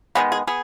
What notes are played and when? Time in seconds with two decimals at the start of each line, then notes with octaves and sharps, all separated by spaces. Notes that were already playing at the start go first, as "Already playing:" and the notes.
0.15 D#3 G#3 B3 G#4
0.32 G#4
0.47 B3 G#4